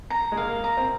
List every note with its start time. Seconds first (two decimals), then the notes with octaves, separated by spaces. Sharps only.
0.10 A#5
0.32 G#3
0.37 A#3 F5
0.64 A#5
0.77 C4